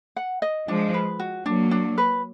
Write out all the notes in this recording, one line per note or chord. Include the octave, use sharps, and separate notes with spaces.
F#5
D#5
F3 G#3 D4
B4
F#4
F#3 A#3 D4
D4
B4